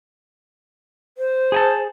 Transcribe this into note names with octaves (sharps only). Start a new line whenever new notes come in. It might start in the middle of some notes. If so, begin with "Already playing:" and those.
C5
G#4 G#5 A5